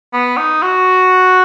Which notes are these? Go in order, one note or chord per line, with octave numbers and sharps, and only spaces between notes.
B3
D#4
F#4